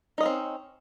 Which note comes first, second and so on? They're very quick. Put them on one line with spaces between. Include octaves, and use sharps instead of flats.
D#4 D#5 C#4 C4